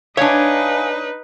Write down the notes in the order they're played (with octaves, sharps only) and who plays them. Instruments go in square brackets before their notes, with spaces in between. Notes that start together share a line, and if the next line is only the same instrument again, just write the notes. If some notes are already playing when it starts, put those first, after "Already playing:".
[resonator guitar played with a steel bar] D4 C#5 [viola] D#4 B4 [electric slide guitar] E5 F5 G#5